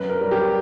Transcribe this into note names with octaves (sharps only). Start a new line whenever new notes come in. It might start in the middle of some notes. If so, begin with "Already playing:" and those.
Already playing: F#2 B4
A#4
G3
G4